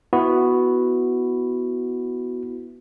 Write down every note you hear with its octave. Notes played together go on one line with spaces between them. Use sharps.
B3 E4 F#4